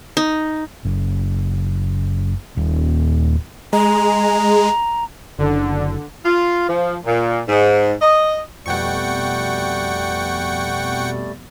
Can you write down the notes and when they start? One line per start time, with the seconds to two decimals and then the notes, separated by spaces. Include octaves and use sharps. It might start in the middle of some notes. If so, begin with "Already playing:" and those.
0.17 D#4
0.85 F#1
2.57 D#1
3.73 G#3 A#5
5.39 F#1 D3
6.25 F4
6.68 F3
7.06 A#2
7.49 G#2
8.02 D#5
8.66 F2 B2 G3 A3 D5 F#5 G5 C#6